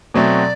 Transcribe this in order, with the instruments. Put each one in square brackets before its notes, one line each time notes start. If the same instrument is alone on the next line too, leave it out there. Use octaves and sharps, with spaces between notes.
[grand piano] B2 F#3 A3 C4 [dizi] D5